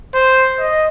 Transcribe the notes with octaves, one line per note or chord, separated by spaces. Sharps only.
C5
D#5